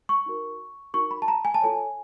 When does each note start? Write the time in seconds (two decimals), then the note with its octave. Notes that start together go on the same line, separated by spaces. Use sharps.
0.09 C#6
0.26 D#4 F#4 A#4
0.94 D#4 F#4 A#4 C#6
1.11 B5
1.22 A5
1.28 A#5
1.45 G#5
1.54 A5
1.62 F4 A4 C#5 G#5